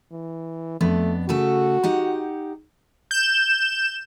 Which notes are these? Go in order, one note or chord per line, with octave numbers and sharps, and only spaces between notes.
E3
F2 A3 B3 D4
C#3 A3 F#4 A4
D#4 G4 F#5
G6 E7